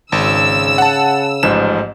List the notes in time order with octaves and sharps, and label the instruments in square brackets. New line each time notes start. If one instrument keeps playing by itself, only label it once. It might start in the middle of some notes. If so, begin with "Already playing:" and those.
[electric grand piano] G#1 [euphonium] C#3 [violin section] E6
[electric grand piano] F#5 A5
[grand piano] A1 G#2 F3 [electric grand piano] E7